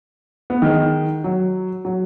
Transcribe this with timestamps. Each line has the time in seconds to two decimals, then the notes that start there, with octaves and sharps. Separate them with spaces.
0.50 B3
0.62 D#3 G#3
1.24 F#3
1.85 F#3